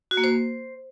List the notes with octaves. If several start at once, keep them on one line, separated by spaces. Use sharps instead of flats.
F#4
A#3
C5